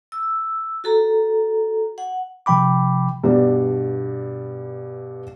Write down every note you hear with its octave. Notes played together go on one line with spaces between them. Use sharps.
E6
F#4 A4 A#5
F#5
C3 F3 G5 B5 D6
G2 B2 D4